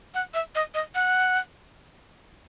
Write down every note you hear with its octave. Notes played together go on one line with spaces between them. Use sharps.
F#5
E5
D#5
D#5
F#5